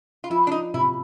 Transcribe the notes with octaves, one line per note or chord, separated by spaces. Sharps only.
F4
F3 E4
D4
D#4
C3 E4